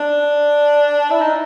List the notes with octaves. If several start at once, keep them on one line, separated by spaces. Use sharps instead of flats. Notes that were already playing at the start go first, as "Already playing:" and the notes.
Already playing: D4
E4
D#4